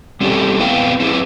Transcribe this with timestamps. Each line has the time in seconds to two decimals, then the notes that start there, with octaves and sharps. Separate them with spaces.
0.21 G3 C4 C#4 F#4 G4 A4
0.59 B3 C4 E4 B4 F5 G5
1.00 C4 E4 G#4 B4